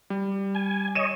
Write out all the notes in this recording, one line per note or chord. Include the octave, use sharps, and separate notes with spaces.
G3
G#5
C#5 D#5 D#7 E7